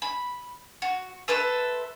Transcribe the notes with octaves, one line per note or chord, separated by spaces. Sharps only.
B5
F#4
A4 B4 C5 E5